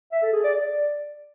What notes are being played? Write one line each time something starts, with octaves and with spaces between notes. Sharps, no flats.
E5
A4
G#4
D5
D5